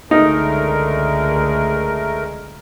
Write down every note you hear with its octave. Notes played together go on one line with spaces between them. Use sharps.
C#2 D3 G#3 A3 D#4 A#4